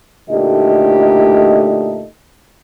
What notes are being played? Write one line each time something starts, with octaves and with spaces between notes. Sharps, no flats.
D2 A#2 A3 D#4 G4 D#5